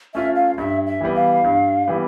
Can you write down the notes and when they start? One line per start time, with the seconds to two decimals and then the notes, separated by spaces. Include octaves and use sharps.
0.14 A3 C#4 F4 E5
0.36 F5
0.57 G2 E5
0.87 E5
1.01 E3 G3 B3
1.15 F5
1.44 G2
1.88 E3 G3 B3